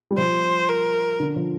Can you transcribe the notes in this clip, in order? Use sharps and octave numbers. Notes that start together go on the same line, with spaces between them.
G3
F3 C5
A#4
D3
F3